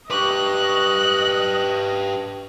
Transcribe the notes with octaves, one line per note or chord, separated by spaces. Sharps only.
G4 B4 D#5 C#6 D6 F#6